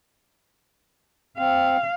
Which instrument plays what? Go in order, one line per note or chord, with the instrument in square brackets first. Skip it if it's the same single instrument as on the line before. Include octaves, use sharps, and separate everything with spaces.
[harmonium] C4 [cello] F5